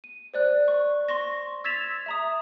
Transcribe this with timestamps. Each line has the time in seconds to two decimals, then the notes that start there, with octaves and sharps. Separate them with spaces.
0.04 D#7
0.34 C5 D5 F#6
0.68 C#6
1.08 C6 C#6 A#6
1.64 E6 G#6 A6 B6 E7 F7
2.06 E5 A#5 D#6